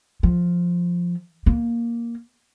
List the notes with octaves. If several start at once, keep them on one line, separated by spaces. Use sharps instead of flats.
F3
A#3